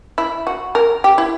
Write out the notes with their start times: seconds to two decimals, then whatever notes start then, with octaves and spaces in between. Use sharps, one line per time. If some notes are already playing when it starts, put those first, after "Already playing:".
0.18 E4
0.47 F#4
0.75 A#4
1.04 G4
1.18 E4